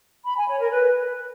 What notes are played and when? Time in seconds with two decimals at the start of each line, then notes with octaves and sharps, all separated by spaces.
0.25 B5
0.37 G#5
0.48 C#5
0.60 A#4
0.72 B4